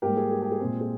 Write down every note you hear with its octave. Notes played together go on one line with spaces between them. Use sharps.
G#2 G3 A#3 G4 A#4
G#4
G#4
G4
G#4
A#2 G#3 C4
G#4